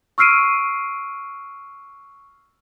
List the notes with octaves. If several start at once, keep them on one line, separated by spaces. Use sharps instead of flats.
C#6 E6 F6 C7 D7 D#7